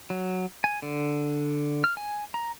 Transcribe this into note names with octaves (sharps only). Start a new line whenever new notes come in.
F#3
G#5
D3
F6
G#5
A#5